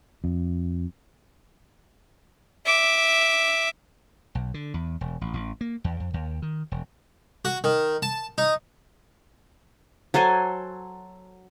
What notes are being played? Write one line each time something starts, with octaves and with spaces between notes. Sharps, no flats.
F2
E5 D6
B1
D3
E2
E1
A1
A1
A#3
E2
F2
D#2
D#3
E1
F#4
D#3
A5
D#4
F#3 A4 C5 G#5